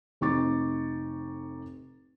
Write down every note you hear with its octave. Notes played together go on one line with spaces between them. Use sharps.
F1 C4 D#4 C#6 D6 A6